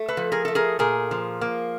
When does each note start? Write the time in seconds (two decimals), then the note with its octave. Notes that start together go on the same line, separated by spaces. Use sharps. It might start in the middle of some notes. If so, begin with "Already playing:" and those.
Already playing: A3
0.08 A4 B4
0.17 F3
0.32 G#4 A#4
0.45 A3 A4
0.55 G#4 A#4
0.79 A#2 G#4 A#4
1.11 F3
1.41 A#3